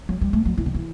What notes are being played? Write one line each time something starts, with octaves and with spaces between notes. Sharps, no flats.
F#3
G3
A3
F#3
E3
D3
E3